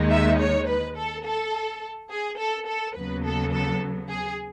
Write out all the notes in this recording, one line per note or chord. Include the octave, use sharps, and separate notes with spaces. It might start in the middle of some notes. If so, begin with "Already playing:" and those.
Already playing: D#2 D#3 G#3 D#4
E5
C#5
B4
A4
A4
G#4
A4
A4
D#2 C#3 F#3 B3 B4
A4
A4
G#4